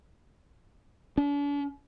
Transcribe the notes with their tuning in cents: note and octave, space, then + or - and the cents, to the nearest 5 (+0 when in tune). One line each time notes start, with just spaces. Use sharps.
D4 -45